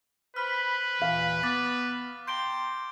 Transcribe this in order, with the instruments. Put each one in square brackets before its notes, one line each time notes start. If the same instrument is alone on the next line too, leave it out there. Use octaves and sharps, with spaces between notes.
[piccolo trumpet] B4 [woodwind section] C5 B5 [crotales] F6
[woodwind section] D#2 A#2 E3 [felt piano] F5
[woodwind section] B3 [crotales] D6 A6
[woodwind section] G5 A#5 C6 [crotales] G6 D7 G7